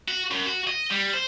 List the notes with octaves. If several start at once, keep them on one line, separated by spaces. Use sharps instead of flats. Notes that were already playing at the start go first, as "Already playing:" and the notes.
F#4
F#2
F#4
D#5
G3
C5